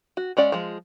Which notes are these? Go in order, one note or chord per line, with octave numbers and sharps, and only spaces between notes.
F#4
G#3 C#4 D5 F#5
F3 G#3